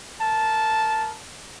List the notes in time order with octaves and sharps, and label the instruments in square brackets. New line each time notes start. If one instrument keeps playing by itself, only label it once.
[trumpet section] A#4 A5